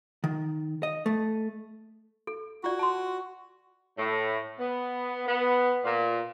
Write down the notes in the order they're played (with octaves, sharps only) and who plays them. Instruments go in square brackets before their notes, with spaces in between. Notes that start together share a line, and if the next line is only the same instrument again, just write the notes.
[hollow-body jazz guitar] D#3
D#5
A3
[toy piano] A4
[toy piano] F4 D5 [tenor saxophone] F#4
[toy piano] A5 C6
[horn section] A2
B3
B3
A#2